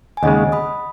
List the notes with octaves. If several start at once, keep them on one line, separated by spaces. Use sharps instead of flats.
G#5
D#2 C#3 G#3 D#5 F#5
B5 D#6